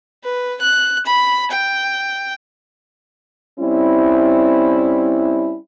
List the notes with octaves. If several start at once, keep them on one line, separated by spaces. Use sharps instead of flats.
B4
F#6
B5
G5
G3 C4 C#4 E4